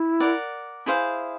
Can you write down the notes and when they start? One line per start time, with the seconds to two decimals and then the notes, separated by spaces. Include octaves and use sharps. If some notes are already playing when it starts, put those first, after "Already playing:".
Already playing: E4
0.20 A#4 D5 F#5
0.86 E4 G#4 C5 F5